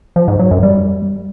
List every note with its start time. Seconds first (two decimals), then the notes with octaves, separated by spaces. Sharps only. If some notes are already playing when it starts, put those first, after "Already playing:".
0.16 F3
0.28 G#2
0.39 F#3
0.51 F#2
0.63 G3